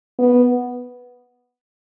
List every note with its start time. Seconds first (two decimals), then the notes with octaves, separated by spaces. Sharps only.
0.19 B3